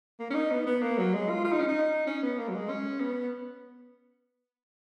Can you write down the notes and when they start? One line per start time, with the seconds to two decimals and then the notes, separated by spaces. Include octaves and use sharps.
0.20 A#3
0.31 C#4
0.35 D#4
0.52 B3
0.67 B3
0.82 A#3
0.98 F#3
1.14 G#3
1.29 F4
1.44 F4
1.52 D#4
1.60 C#4
1.68 D#4
2.07 C#4
2.23 B3
2.38 A#3
2.48 F#3
2.54 G#3
2.69 C#4
3.00 B3